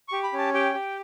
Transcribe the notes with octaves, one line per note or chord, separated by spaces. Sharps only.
G4 C#6
B5
C#4
A5
G4 G5
G4